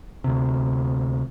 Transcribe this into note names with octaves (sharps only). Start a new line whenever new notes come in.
D2 C3